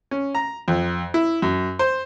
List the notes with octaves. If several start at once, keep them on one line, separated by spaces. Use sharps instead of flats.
C#4
A#5
F2
E4
F#2
C5